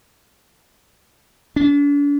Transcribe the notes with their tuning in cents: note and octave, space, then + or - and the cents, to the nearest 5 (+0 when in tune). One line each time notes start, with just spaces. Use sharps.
D4 -40